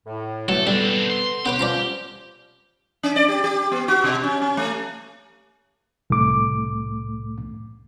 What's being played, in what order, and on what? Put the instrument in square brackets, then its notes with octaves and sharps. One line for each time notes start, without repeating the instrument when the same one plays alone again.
[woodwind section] A2
[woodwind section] E3 A3 [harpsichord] F#3 [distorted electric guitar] A4
[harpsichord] G3 [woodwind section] B3 A4 [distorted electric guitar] C4 D4
[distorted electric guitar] C6
[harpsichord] B3 B4 C5 [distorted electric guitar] G4
[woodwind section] F3 C#4 [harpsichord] D5 A#5 C6
[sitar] C#4
D5
G4
G4
B3
F#4
B2
C#4
C#4
A3
[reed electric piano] C2 A2 A3 D6